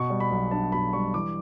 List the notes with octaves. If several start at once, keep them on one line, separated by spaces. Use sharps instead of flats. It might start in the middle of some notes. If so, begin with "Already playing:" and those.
Already playing: B2 C#6
G3
B5
B1
D4 A5
B2 B5
G3 C#6
E3 D6